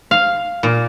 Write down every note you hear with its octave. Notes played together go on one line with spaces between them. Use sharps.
F5
A#2